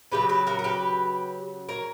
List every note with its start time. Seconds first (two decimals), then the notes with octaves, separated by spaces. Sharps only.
0.12 C#3 F#3 G4 B4
0.29 G4 B4
0.47 F#4 A#4
0.59 A#4
0.64 G4 B4
1.69 A#4 C#5